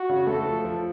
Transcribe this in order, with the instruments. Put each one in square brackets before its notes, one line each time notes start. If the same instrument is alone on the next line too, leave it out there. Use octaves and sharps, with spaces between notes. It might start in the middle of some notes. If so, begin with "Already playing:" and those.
Already playing: [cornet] F#4
[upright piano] C#3
[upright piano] A3 [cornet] A4
[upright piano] F3
F3